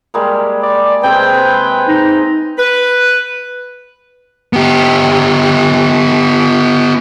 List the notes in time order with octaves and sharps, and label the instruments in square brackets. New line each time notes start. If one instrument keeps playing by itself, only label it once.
[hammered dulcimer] G3 G#3 A#3
[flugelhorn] D5
[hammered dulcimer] C3 G#3 C4 [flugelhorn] B4 [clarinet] G5
[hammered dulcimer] C5
[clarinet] D#4
[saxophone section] B4
[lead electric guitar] B3 G4